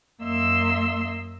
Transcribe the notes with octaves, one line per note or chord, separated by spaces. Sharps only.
F#2 A#3 D#5 E5 C6 E6